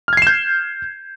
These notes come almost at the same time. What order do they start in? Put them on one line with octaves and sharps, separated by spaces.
F6 G#6 C7 E7 G6